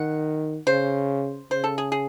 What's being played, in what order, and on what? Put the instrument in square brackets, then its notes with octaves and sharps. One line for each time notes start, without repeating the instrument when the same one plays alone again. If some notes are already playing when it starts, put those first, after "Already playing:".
Already playing: [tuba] D#3 [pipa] F#5
[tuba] C#3 [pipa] C5
[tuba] C#3 [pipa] C5
[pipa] A4
G#4
G#4